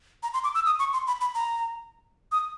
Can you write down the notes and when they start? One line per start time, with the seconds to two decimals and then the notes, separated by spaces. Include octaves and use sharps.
0.23 A#5
0.34 C6
0.44 D6
0.55 E6
0.66 D#6
0.79 C#6
0.93 C6
1.07 B5
1.21 B5
1.35 A#5
2.32 D#6